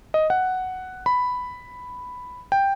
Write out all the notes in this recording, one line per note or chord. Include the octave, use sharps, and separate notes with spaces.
D#5
F#5
B5
G5